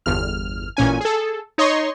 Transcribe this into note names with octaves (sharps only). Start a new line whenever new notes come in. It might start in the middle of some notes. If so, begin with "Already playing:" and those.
G1 E2 F6
A1 A#2 C#4 G#5
G#4 A4
D#4 C#5 D#5 C6 C#6